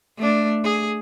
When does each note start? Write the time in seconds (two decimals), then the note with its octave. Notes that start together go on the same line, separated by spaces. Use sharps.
0.17 A3 D4
0.64 G#4